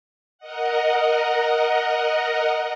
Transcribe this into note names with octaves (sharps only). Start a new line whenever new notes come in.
A#4 D#5 F#5